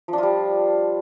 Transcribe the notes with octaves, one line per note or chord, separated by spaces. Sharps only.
F3 G3 D4 F4